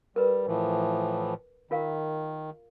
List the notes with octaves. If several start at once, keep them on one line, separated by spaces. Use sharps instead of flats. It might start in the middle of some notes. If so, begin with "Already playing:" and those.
G3 A#4 B4
A2 E3 F3
D#3 F4 A#4 F5